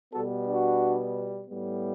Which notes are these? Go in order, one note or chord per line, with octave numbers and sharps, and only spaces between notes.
B2 G3 B3 F#4 A4
D4 F#4
A2 G3 B3